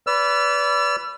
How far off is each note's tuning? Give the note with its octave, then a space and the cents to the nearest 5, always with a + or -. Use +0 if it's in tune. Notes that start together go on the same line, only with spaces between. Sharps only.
B4 +0 D5 -30 E6 +40